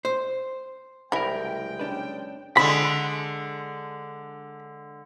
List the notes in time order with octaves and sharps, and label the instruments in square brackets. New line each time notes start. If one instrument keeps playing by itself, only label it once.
[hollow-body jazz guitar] C5
[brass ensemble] F#1 G#3 G5 [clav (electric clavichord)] C2 A#4 [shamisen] E3 E4
[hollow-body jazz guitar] C#4 D4 B4
[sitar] D3 G#3 [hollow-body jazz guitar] B5